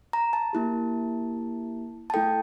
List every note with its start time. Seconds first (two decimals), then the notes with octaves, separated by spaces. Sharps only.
0.13 A#5
0.33 A5
0.53 A#3 E4 G4
2.10 A5
2.14 A3 E4 A4 G5